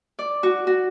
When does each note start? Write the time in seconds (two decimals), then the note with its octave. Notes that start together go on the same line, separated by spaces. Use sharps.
0.19 D5
0.43 F#4
0.67 F#4